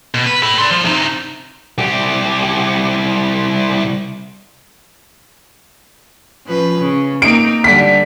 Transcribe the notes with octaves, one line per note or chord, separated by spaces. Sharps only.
B2
B4
A4 B5
D5 C6
F3
C3 D#4
C2 G4
F3 C#4 B4
C#3
A#3 C4 D#4 D7
D3 G3 B6